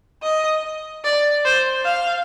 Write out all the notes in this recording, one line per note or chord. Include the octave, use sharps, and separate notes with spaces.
D#5
D5
C5
F5